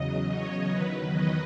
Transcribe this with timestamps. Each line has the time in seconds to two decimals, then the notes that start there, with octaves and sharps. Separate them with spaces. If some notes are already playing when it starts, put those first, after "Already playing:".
Already playing: E2 C#3 F#3 D#5
0.29 C#5
0.71 E2 D#3 F#3 B4
1.12 D#5